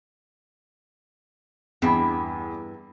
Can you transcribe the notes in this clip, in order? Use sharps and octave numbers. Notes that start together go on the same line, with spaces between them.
E2 G2 E4 G5